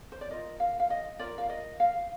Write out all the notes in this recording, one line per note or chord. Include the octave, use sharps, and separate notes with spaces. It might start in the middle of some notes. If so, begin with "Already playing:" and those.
C5
D5
F4 A#4 D#5
F5
F5
D#5
F4 A#4 D5
F5
D#5
F5